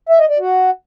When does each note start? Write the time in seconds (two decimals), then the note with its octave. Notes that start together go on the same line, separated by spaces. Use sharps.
0.09 E5
0.19 D#5
0.29 D5
0.39 F#4